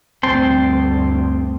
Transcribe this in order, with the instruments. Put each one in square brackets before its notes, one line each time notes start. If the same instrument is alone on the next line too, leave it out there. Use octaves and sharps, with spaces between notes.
[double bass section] D2 G2 [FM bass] C4 [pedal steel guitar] G5 A5 C6